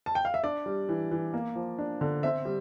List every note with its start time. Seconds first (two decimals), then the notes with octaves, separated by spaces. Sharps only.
0.06 A5
0.15 G5
0.25 F5
0.34 E5
0.44 D4 D5
0.66 G3
0.89 E3
1.11 E3
1.34 A#3
1.55 F3
1.79 D4
2.01 D3
2.23 C4 E5
2.45 G3